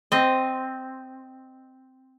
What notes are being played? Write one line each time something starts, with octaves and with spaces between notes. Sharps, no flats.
C4 D#5